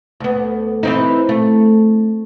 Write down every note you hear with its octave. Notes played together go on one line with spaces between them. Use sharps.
D2 B3
E3 C4 D#4
A3